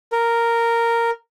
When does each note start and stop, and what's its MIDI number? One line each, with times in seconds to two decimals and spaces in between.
0.12 1.10 70